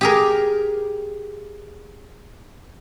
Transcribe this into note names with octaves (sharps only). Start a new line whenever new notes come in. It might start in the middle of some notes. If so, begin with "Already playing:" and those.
G4 G#4 A#4